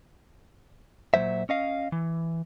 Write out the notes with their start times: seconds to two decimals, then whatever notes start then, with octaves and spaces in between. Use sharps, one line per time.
1.14 A#2 F3 F#3 C5 E5
1.49 C#4 D#5 F5
1.92 E3